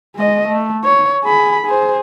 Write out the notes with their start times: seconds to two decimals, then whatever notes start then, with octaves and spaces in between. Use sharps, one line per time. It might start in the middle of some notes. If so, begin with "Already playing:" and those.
0.16 G#3 D#5
0.48 A3
0.84 C#5
1.24 G#4 B5
1.66 G#4 C5